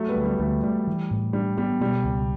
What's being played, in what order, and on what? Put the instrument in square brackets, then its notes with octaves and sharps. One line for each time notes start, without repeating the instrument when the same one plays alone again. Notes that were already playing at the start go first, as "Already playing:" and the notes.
Already playing: [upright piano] F#3 A3
G3 B3
[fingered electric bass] D2
[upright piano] G3
[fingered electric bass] D2 [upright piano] F#3 A3
[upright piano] G3 [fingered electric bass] A3
[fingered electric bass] E3
A2
[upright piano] G3 [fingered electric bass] D4
[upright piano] G3 [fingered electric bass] B3
[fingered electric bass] B2 [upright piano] G3
[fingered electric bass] C#2